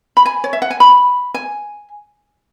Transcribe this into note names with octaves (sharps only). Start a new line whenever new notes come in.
B5
G#5
C#5
E5
F#5
G#5
B5
G#5